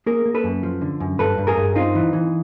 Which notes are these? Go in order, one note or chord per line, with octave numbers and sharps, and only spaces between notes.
A#3 G#4 A#4
A#3
A4 B4
F#2
F3
D3
F#2
G2 A4 B4
G2
G#4 A#4
G2
C4 D#4 F4
E3
E3